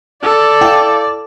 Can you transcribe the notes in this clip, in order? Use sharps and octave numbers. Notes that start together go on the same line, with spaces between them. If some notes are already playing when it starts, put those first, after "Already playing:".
A4 D5
E4 F5 G5